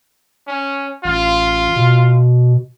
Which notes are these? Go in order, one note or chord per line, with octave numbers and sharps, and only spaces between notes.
C#4
A1 F4
B2